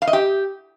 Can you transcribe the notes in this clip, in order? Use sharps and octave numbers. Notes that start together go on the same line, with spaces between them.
F5
D#5
G4